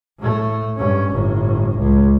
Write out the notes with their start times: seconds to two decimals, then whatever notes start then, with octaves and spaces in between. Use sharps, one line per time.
0.19 A2 A3
0.78 G2 C#4
1.13 G1 A2
1.78 C#2